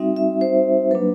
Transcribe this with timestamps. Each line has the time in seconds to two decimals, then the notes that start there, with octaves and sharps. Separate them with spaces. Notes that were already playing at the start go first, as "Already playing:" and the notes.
Already playing: G3 C4 D#4 F#4 E5
0.16 E5
0.41 C5
0.91 F#3 A#3 D4 B4